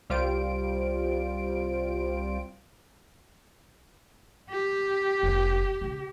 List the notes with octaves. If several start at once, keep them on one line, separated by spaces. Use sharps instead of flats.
C2 G3 F4 C5 D7
G4
F1 A#3
C#3 C#4